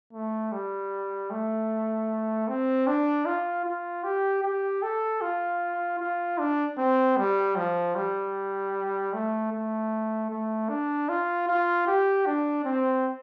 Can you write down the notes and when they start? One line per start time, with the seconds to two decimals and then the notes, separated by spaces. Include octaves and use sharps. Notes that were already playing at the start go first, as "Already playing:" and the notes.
0.13 A3
0.52 G3
1.30 A3
2.48 C4
2.87 D4
3.26 F4
3.65 F4
4.03 G4
4.43 G4
4.83 A4
5.21 F4
5.99 F4
6.38 D4
6.78 C4
7.18 G3
7.56 F3
7.95 G3
9.13 A3
9.52 A3
10.30 A3
10.69 D4
11.09 F4
11.47 F4
11.87 G4
12.26 D4
12.65 C4